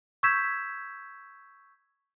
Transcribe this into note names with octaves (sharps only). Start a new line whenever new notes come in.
C#6 E6 G6 G#6 B6 E7